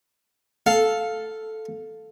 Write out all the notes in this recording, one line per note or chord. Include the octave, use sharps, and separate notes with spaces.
A4 F5